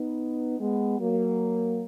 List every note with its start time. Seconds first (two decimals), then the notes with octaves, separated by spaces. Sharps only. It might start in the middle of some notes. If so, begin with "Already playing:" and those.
Already playing: B3 D#4
0.59 G#3 B3
0.99 F#3 A#3